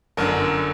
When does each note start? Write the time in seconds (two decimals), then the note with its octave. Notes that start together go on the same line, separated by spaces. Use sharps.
0.17 G1 F#2 D3 A#4